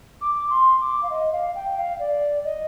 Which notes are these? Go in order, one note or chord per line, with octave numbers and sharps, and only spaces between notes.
D6
C6
D6
F5
D#5
F5
G5
F5
D5
D#5